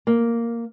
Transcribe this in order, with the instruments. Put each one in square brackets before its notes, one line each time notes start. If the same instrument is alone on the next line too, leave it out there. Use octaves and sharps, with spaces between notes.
[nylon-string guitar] A#3